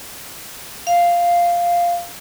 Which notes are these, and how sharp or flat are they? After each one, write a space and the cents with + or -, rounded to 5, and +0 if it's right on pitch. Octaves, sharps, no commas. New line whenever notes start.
F5 -5